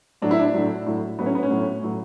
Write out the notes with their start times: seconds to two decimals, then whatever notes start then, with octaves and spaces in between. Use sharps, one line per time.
0.22 A2 F#3 D4
0.31 E4
0.39 D4
0.54 A2 F#3
0.86 A2 F#3
1.19 A2 F#3 B3
1.26 C#4
1.35 B3
1.43 C#4
1.51 A2 F#3
1.83 A2 F#3